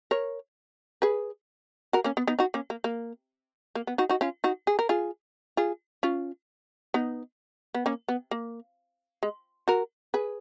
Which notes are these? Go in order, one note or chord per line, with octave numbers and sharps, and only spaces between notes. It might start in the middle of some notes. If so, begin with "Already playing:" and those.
A#4 C#5
G#4 B4
F#4 A#4
A#3 C#4
B3
B3 D#4
D#4 F#4
A#3 C#4
A#3
A#3
A#3
B3
D#4 F#4
D#4 F#4
C#4 F4
D#4 F#4
G#4
A#4
F4 G#4
F4 G#4
C#4 F4
B3 D#4
B3
A#3 C#4
B3
A#3
G#3
F#4 A#4
G#4 B4